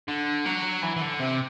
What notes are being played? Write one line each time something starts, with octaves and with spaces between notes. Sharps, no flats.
D3
F#3
E3
E3
D3
C3